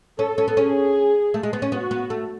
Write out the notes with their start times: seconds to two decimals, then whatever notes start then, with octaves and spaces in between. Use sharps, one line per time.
0.18 C#4 A4
0.38 C#4
0.48 B3
0.57 C#4 G#4
1.34 A3
1.43 G#3
1.53 B3
1.62 C#4
1.72 B3 F#4
1.91 B3
2.10 A3